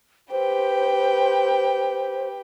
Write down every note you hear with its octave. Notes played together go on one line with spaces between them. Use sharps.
G4 B4 C5 G5